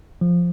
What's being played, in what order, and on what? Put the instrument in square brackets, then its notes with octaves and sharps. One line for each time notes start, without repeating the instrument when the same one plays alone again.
[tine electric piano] F3